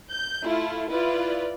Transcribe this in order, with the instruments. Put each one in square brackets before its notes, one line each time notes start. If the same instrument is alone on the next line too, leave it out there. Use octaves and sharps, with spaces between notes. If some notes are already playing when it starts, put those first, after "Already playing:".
[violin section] G6
A3 E4 F4
E4 F4 B4 D5